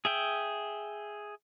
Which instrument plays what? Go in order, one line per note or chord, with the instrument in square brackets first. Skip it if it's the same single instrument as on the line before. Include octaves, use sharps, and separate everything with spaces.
[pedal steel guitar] G#4 E5 G5